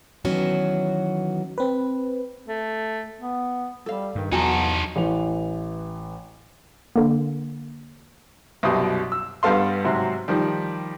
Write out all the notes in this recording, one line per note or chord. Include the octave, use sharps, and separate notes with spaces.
D#3 E3 F#3 B3 C#4 F#4
C4 B4
A3
B3
G3 A4 F5
G2 D#3
E2 B3 D#4 F#4 A4 G#5 A#5
A1 E3 F7
D3 A#3
C2 F#2 B2 G3 D#6
E6
G2 G3 B3 A4 F5 C6
G#2 C3 F#3
D#3 F3 G3